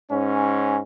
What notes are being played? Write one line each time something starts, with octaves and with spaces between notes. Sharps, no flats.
G#2 C#4